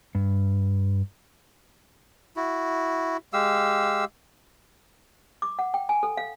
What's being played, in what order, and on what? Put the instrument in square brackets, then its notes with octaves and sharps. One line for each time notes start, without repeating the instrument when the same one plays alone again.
[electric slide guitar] G2
[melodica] E4 F#4
G#3 G4 F5 E6
[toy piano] D6
F#5
G5
G#5
A4
F5